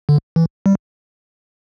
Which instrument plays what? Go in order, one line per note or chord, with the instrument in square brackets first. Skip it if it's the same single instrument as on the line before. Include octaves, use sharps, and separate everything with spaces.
[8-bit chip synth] D3
E3
G3